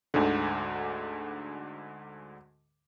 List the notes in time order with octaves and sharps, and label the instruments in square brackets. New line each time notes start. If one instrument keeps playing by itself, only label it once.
[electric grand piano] D2 G#2 D3